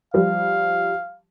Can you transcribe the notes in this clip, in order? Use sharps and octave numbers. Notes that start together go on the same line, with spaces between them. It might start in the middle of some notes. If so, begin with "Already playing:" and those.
F3 G3 F5